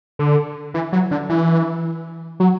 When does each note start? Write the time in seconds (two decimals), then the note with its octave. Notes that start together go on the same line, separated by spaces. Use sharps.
0.19 D3
0.74 E3
0.93 F#3
1.11 D3
1.30 E3
2.40 F#3